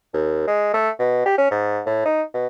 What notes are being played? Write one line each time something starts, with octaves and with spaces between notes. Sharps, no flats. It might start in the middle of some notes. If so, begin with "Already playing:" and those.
D#2
G#3
A3
B2
G4
C#4
G#2
A2
D#4
B2